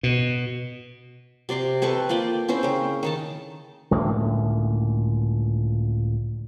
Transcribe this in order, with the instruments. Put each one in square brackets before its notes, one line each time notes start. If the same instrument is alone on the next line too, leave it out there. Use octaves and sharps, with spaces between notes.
[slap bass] B2
[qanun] C3 D5 C6 D6
C4 A4 B4 C#6
A#3 F4 D5 G5
C4 C#4 E4 C5
C#3 A#4
D#3 D#4 A5
[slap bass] C#2 A2 D3 A#3